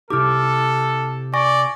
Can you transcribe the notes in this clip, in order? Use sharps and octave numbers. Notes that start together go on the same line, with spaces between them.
C3 E4 G4 A4 D6 F6
D5 G#5 C#6 A#6